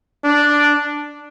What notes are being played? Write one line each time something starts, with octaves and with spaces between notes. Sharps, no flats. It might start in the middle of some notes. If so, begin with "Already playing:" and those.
D4